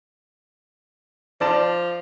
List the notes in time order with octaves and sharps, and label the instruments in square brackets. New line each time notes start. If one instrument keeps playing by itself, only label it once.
[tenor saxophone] F3 [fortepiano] D5 A5